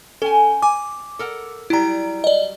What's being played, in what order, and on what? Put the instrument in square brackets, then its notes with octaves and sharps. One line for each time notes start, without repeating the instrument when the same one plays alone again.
[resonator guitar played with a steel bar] C#4 G5 G#5 [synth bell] A4
[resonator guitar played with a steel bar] G#5 [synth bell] D6
[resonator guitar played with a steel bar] A4 A#4 F#5
[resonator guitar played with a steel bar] F#3 G3 [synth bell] E4 A#5
[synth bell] D5 D#5